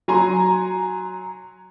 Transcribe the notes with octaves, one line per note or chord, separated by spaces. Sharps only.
F#3 G#5 A#5 C6